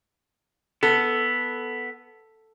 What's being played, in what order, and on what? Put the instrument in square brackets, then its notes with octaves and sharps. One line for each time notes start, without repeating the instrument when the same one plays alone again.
[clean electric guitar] B3 [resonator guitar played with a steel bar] A4